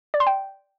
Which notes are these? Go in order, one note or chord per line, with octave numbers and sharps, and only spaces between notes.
D5
C6
G5